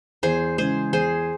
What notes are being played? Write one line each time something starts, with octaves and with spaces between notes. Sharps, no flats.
E2 G#4 C5
C#3 E3 G#3 G#4 C5
E2 G#4 C5